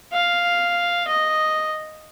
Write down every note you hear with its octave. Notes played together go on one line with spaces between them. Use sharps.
F5
D#5